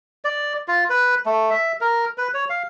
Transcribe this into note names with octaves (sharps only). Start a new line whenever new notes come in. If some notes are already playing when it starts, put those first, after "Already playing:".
D5
F4
B4
A3
E5
A#4
B4
C#5
F5